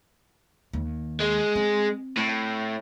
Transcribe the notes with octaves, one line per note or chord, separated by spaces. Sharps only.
D#2
G#3
C4
A2